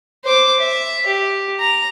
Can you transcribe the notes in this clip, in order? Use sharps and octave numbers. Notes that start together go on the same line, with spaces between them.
C5 D6
E5
G4
A#5